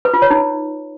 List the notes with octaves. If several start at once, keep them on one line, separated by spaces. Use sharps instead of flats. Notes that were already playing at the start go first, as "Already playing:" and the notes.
B4
F4
C#5
D#4